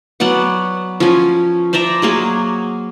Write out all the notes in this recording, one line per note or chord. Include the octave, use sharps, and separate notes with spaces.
F#3 B3 D5 F#5
F3 C#4
C5 D5 E5 A#5
F#3 A#3 G#4